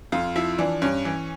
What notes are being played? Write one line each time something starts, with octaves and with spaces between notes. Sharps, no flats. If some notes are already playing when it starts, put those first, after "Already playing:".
F2 F4
F3 E4
E3 D4
G2 C#4
E3